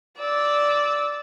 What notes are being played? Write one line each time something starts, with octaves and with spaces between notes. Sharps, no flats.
D5 E6